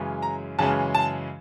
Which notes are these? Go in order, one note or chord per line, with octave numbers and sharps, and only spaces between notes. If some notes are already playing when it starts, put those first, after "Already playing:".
Already playing: F#2 C#3 E3 G#3 C#4
A#5
F#2 C#3 E3 G#3 C#4 A5
A5